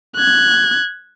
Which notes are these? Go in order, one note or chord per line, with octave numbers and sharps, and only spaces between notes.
F#6 G#6